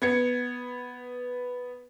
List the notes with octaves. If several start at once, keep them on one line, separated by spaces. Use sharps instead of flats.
B3 G#6 C#7